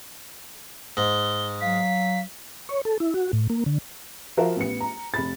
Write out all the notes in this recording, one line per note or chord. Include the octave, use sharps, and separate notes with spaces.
G#2 G7
F#3 F5 B6
C#5
A4
E4
F#4
A2
A#3
D3
F3 F#4 A#4 E5 F5
A1 B3 C#7
A#5
F1 B5 A6